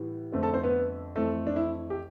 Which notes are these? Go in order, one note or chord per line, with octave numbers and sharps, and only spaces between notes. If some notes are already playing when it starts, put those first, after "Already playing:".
Already playing: A2 E3 G3 B3
F2 D3 A3 C4
A4 A5
C4 C5
B3 B4
F2 E3 A3 C4 A4
D4
E4
G4